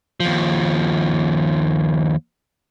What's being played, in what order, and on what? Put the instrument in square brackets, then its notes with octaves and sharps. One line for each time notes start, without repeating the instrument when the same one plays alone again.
[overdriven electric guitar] D#2 F3